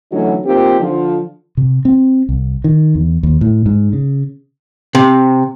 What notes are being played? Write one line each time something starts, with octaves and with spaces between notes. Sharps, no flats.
D3 E3 F#3 A3 C#4 D#4
F3 A#3 C4 D#4 G4
D3 F3
C3
C4
C2
D#3
E2
D#2
A2
G#2
C#3
C3